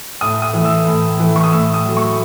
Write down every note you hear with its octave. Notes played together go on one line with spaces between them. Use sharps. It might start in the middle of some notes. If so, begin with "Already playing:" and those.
A2 D#6
D#6
E3 A3
E6
A2
E3 A3
C#6
D#6
A2 E6
D#6
F#3 A3
C#6